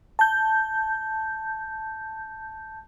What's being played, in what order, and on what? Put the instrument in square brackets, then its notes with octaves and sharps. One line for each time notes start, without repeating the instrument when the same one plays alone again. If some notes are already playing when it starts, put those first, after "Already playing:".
[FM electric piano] A5 G6